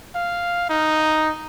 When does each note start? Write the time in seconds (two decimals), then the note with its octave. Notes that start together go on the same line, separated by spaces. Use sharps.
0.15 F5
0.69 D#4